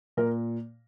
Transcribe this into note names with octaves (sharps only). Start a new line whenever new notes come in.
A#2 A#4